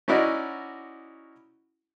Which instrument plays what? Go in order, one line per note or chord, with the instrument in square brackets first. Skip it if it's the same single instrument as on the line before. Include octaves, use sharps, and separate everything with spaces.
[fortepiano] C#4 D#4 E4 F#4 D5